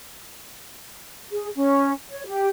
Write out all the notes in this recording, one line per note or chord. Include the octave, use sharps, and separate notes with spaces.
G#4
C#4
C#5
G4